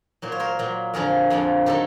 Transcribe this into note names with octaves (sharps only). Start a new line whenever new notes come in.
A#2 F#3 C5
C#5
A#4 C5
A#2 F#3
F2 D3 F3 G#4 A#4
F2 D3 F3
D#3 F#3 G4 A4